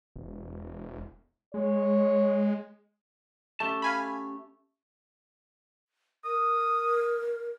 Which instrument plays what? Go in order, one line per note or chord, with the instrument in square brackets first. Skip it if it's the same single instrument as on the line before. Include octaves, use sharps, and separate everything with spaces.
[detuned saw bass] E1
[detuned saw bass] G#3 [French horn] C#5
[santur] A3 [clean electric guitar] C#4 G4 A5
[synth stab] F5 G#5 B5
[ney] A#4 [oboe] D#6